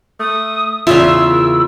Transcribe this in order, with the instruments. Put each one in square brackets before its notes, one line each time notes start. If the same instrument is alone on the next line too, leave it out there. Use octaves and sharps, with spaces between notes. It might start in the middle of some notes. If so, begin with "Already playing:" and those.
[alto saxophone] A3 [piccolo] D#6
[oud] E2 C#3 C#4 [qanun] F4 [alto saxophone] E5 [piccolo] E6
[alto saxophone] A#4